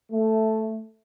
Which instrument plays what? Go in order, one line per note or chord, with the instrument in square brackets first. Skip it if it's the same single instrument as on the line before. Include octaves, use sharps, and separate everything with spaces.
[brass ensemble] A3